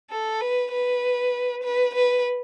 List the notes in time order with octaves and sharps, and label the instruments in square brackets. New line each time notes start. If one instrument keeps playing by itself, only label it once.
[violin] A4
B4
B4
B4
B4